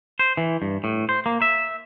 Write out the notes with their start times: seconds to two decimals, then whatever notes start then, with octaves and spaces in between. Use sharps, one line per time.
0.19 C5
0.37 E3
0.62 G2
0.84 A2
1.09 C5
1.26 A#3
1.42 E5